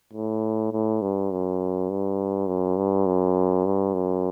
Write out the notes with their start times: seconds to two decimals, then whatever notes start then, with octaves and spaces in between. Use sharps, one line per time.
0.13 A2
0.72 A2
1.02 G2
1.31 F#2
1.90 G2
2.47 F#2
2.77 G2
3.06 F#2
3.65 G2
3.93 F#2